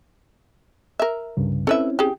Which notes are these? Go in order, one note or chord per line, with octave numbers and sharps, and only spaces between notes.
A#4 E5
C2 G2 C#3
C4 C#4 E4 A4 B4 E5
G4 G#4